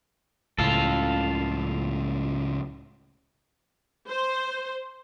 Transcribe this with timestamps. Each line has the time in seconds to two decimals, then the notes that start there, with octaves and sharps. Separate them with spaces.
0.58 C#2 A2 C#3 F4 A4
4.09 C5